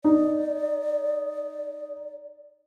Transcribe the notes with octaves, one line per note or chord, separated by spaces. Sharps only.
D#4 D5